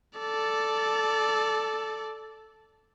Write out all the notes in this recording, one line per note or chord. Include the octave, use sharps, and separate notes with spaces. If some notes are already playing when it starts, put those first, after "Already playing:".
A4 D5